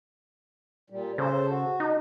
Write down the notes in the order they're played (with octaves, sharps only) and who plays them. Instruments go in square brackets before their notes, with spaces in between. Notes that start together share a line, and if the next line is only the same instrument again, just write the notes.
[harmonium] A#2 G3
[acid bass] C#3 [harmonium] A4 C5
[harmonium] F#4
[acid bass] D#4